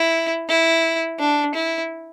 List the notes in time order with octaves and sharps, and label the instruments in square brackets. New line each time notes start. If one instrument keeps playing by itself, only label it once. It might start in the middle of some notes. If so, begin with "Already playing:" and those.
Already playing: [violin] E4
E4
D4
E4